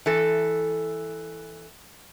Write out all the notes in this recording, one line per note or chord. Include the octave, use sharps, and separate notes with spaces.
E3 A4